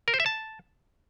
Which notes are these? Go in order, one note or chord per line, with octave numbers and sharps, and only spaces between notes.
A#4
C5
E5
A5